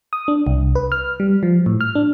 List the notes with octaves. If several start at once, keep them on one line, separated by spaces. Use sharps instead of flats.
D#6
D4
C2
B4
F6
G3
F3
A2
F6
D4